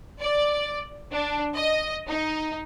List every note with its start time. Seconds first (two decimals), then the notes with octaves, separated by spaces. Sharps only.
0.20 D5
1.11 D4
1.54 D#5
2.08 D#4